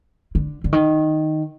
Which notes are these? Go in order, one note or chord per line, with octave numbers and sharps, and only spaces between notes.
D3
D3
D#3